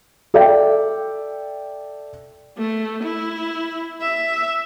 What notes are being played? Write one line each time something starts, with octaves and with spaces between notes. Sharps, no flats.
A4 D5 E5 G5
A3
E4
E5